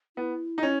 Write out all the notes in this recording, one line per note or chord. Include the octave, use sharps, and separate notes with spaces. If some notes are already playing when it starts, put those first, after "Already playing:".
B3 E4
D#4
C#4